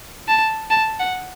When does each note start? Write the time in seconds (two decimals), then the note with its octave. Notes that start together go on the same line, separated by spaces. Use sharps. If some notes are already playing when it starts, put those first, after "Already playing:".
0.28 A5
0.70 A5
1.00 F#5